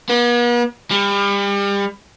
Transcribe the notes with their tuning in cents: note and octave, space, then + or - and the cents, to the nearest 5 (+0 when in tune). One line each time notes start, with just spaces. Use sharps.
B3 -45
G3 +35